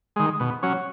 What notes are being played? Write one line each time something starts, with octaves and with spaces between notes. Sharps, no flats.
D#3 G#3
B2
F#3 C#4